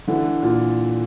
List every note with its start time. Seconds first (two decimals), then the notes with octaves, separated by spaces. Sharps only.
0.08 D3 E3
0.42 A#2